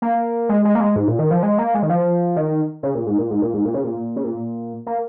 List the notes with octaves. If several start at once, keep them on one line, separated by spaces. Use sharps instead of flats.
A#3
G#3
G#3
A#3
G#3
G#2
A#2
D#3
F3
G#3
A#3
G#3
D#3
F3
D#3
C#3
A#2
G#2
A#2
G#2
A#2
G#2
A#2
C#3
A#2
C#3
A#2
A#3